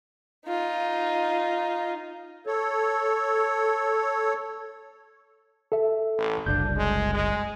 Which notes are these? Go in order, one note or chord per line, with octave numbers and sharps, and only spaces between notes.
D#4 F4
A4 C#5
A4 E5
A1
F#1 C2 D4 G6
G#3
G#3